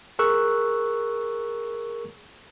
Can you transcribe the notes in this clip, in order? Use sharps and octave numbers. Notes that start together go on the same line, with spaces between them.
G#4 A#4 C#6 E6 F#6